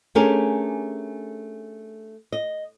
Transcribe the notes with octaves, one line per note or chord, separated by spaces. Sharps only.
A3 C#4 D4 G4 G#4 A#4
D#5